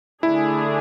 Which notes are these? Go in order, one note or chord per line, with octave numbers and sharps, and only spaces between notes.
D3 A3 D4 E4 G#4